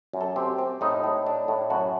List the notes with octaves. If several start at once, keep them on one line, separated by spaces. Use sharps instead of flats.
F#2
A4
C4 G4
C4
A2 D#4
A2
D4
A2
F#2 F#4